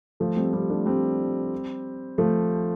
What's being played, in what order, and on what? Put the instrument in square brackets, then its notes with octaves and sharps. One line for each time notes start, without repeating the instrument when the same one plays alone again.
[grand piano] F3 A3
G3 C4
G3 C4
A3 D4
G3 C4
F3 A3